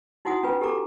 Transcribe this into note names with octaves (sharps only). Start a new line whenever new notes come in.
D#4 E4 F#4 F#5 G#5 D#6
C#4 F4 B4 G#5
G4 A4 G#5 A#5 D6